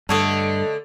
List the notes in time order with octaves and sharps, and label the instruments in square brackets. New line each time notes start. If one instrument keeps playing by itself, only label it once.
[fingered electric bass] G2 [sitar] D3 A3 [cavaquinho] A4 C#5 D#5